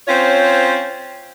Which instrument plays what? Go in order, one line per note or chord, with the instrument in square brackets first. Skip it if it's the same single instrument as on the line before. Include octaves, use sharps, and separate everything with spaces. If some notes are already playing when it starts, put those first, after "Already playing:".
[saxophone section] C4 C#4 F4 C5 C#5